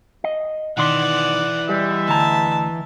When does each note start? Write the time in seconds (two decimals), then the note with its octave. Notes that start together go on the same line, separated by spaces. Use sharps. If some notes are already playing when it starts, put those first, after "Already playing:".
0.24 D#5
0.77 B2 D#3 E3 D5 F#5 C6
1.69 G3 G#3 B3 E5
2.08 D2 A5 A#5